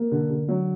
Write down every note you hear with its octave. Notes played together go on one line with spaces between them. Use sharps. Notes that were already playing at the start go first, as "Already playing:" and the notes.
Already playing: A#3
D3
D3
F#3